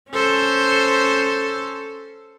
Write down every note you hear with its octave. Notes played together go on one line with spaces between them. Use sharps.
C#4 A4 C5